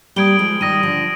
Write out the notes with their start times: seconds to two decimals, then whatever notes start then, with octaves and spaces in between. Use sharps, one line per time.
0.16 G3 A#3 D#6 G#6 D7 G7
0.39 F3 G#3
0.61 D#3 G3 D#6 A#6 D#7
0.83 D3 F3